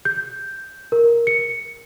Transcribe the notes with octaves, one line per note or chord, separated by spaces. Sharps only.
G6
A#4
C#7